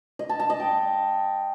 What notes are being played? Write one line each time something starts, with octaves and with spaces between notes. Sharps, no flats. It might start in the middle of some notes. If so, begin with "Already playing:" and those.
D#5
A5
A5
D#5
G5